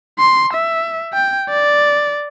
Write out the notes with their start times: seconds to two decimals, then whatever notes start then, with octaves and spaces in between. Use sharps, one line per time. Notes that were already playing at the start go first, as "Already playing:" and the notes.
0.19 C6
0.53 E5
1.13 G5
1.49 D5